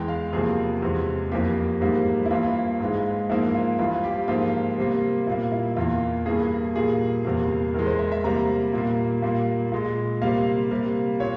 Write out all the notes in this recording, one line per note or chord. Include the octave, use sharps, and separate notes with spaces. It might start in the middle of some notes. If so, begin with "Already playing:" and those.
Already playing: E2 E3 G#3 G5
F5
E2 C3 F3 A#3 G#4
E2 C3 E3 G#3
F2 E3 A#3 G4
G#2 G3 A#3
E4
G2 E3 A#3 F4
G#2 E3 G#3
G#2 F3 A#3 E4
F4
G2 E3 G3 F4
G4
G#2 F3 A#3 F4
C3 G3 A#3
A#2 G3 A#3 F4
E4
E2 E3 A#3 F4
G2 E3 A#3 G#4
A#2 G3 A#3 G#4
E2 C3 G3 A#3
E2 E3 G#3 A#4
C5
E5
E5
C3 G3 A#3 A#5
A#2 G3 A#3
A#2 G3 A#3
A#2 G#3
C3 G3 A#3 F5
C3 G3 A#3
A#2 C#5